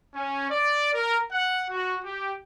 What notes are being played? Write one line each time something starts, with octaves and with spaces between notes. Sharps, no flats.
C#4
D5
A#4
F#5
F#4
G4